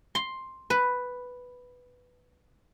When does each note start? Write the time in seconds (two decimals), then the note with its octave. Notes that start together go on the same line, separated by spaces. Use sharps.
0.15 C6
0.70 B4